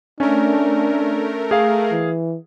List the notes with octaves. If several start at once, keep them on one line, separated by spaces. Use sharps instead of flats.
A3 C#4 D4 A#4
G#4 F5
E3